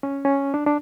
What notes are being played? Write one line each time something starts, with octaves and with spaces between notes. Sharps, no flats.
C#4
C#4
D4
D4